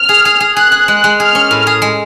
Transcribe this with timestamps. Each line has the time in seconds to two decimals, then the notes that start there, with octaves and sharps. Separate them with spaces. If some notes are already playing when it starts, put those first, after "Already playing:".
Already playing: F6
0.09 G#4
0.25 G#4
0.40 G#4
0.57 G#4 F#6
0.72 G#4
0.88 G#3
1.04 G#3
1.19 G#4 F6
1.35 C#4
1.51 A2
1.67 G#4
1.82 G#3